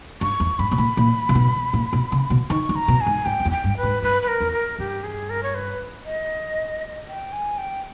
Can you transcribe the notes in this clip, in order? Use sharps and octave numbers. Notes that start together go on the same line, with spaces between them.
G2 C#6
E2
G2 B5
B2
A#2
A#2
C#3
B2
A#2
B2
C#3
B2
D#3 C#6
D#3
A#5
B2
G#5
G#2
G2 G5
G2
E2
G5
G2
B4
G#2
G2 B4
B4
A#4
E2
A#4
G2 G4
G#4
A#4
C#5
B4
D#5
G5
G#5
G5